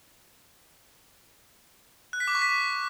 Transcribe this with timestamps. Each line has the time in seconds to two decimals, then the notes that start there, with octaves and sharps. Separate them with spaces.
2.13 F#6
2.20 B6
2.28 D6
2.35 C#6
2.42 B6